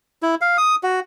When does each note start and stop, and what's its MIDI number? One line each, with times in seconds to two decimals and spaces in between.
0.23 0.35 64
0.41 0.57 77
0.58 0.76 87
0.83 1.00 66